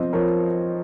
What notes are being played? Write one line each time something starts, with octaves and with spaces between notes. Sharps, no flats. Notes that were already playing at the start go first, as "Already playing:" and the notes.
Already playing: F3 C4 C5 D#5
F3 A#4 C#5